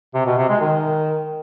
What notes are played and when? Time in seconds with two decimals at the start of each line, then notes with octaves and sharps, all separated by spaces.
0.14 C3
0.26 B2
0.38 C3
0.49 G#3
0.61 D#3